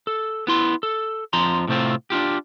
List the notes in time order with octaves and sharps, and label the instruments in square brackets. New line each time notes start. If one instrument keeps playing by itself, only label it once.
[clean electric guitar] A4
B3 E4 C6
A4
F2 F3 A#5 C6
A2 C3 A3 C4 F4
D4 D#4 F4 G4